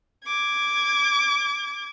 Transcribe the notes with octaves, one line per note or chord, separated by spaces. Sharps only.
D6 G#6